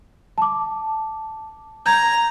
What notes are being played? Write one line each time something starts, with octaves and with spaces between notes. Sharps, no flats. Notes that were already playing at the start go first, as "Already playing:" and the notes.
A5 D6
A#5 G6 G#6